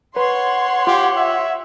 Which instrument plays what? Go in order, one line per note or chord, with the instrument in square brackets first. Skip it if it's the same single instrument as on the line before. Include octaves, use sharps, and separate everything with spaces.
[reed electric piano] B4 [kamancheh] C#5 F#5 [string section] C6
[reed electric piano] F4 [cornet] G4
[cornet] E5